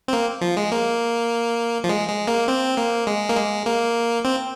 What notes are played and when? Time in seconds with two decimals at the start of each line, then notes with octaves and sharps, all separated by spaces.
0.08 C4
0.13 A#3
0.41 F3
0.57 G#3
0.72 A#3
1.84 F3
1.89 G#3
2.09 G#3
2.27 A#3
2.48 C4
2.77 A#3
3.07 G#3
3.29 A#3
3.36 G#3
3.66 A#3
4.25 C4